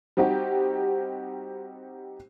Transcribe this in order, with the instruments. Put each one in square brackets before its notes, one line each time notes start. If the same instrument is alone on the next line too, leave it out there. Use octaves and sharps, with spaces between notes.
[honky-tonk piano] G3 C4 D#4 F#4 G4